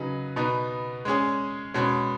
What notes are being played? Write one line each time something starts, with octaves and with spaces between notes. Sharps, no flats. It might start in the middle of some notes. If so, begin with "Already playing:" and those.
Already playing: C#3 F#3 D#4 G#4 B4
B2 B3 D#4
G#3 C#4 G#4
B2 G#3 C#4